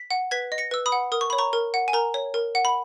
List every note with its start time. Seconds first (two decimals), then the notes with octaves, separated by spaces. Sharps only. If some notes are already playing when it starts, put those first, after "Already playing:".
Already playing: B6
0.11 F#5
0.31 B4 G#6 B6
0.52 D#5
0.58 A#6 C#7
0.71 B4 E6
0.86 B5 D#6
0.92 F#5
1.12 A#4 D#6
1.21 C#6
1.30 C#5 B5
1.38 A#5 C#6
1.53 A#4
1.74 F#5
1.88 G#5
1.93 A#4 A#5
2.14 C#5
2.34 A#4
2.55 F#5
2.65 B5